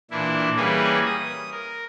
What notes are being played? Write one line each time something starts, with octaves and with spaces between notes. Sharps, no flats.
A#2 E3 D4 E4
E3 G3 A#3 C#4 G#4 B4
D#6
A#4